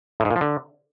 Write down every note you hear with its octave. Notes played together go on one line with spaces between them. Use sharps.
A2
G#2
A#2
F3
D3